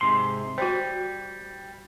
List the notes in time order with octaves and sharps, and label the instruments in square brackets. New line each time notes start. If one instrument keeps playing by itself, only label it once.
[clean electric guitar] G#2 C3 C6
[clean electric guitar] G3 [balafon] F#4 C5